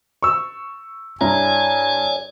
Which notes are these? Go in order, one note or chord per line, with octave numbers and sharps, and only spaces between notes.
C#6 E6
G2 E4 C#5 D5 G#5 A#5